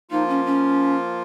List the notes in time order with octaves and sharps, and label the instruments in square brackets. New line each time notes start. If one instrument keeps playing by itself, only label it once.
[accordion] F3 A#3 F4 [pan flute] D#4
[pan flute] C#4
C#4